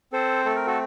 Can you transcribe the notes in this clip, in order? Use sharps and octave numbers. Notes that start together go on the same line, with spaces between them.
C4 A4 C5
A3 A4
A#4
F#4 A4